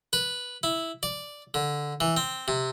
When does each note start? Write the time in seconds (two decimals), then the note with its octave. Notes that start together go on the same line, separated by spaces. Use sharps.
0.13 B4
0.63 E4
1.03 D5
1.54 D3
2.00 E3
2.17 C4
2.48 C3